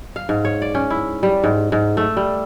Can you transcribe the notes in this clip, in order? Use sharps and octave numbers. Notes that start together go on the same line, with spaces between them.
F5
G#2
C#5
D5
C#4
E4
G3
G#2
G#2
A3
G3